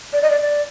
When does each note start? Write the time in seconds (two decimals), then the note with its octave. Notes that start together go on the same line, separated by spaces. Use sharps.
0.13 D5
0.22 D#5
0.30 D5